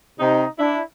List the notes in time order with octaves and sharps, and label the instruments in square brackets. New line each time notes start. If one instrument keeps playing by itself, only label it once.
[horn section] C3 D#4
D4 E4